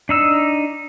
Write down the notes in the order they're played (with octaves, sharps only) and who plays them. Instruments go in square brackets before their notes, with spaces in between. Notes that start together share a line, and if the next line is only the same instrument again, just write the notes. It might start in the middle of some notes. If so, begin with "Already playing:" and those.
[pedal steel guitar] D4 D#4 E6